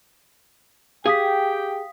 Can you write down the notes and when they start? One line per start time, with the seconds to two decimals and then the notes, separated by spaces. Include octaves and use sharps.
1.06 G4 G#4 F5 G5 D#6 B6